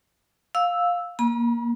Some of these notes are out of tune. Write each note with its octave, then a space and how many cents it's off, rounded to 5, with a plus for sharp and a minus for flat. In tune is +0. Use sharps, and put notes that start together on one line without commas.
F5 +10 E6 +0
A#3 +10 B5 -45